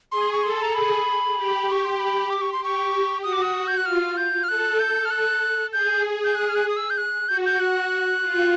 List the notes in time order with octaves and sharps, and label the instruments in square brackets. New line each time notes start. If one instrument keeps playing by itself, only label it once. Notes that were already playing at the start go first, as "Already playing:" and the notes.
[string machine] G#4 [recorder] C6
[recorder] C#6
[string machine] A4 [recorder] C6
[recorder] A#5
[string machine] G#4 [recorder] B5
[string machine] G4
[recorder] C#6
C6
B5
D6
C#6
C6
[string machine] G4 [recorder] C#6
[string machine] F#4 [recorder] D#6
[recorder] D6
D#6
G6
F#6
[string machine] F4 [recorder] F6
[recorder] G6
F6
[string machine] A4 [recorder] F#6
[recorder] G6
F6
F#6
[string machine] G#4 [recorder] G6
[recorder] G6
F#6
F6
F#6
D#6
E6
G6
F#6
[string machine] F#4 [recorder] G6
[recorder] G6
F#6
[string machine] F4